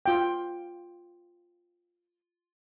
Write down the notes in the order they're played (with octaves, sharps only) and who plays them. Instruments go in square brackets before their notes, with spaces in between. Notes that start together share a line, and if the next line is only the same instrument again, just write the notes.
[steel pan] F4 G5